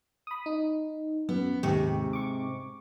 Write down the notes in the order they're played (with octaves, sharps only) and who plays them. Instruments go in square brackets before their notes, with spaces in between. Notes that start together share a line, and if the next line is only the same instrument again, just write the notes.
[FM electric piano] B5 D#6
D#4
[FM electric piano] F#2 [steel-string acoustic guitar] B3
[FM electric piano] D#2 G4 C#6 [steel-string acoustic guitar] G#2 C3
[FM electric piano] C#6 D6